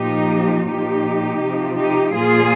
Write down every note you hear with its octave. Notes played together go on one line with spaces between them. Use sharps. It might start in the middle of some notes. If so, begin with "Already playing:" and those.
Already playing: A#2 F3 D#4 G4
A#2 F3 D#4 G4
C3 F3
D#4 G4
A#2 F3 F4 G#4